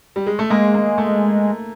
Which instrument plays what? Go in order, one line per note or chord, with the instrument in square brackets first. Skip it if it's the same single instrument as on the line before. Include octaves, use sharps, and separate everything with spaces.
[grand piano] G3
G#3
A3
[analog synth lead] G#3 [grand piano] A#3
[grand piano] A#3
A3